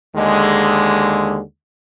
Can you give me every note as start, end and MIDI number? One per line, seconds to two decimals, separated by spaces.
0.15 1.41 39
0.15 1.41 50
0.15 1.41 56